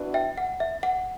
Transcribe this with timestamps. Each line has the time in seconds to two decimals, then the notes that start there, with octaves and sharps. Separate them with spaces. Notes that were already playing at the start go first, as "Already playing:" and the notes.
Already playing: E3 B3 D4 F#4
0.14 E5 G5
0.38 F#5
0.60 E5
0.83 F#5